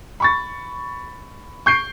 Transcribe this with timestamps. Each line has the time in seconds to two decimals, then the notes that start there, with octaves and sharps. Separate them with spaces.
0.20 B5 C#6 A6
1.66 C#6 G6 C7 D7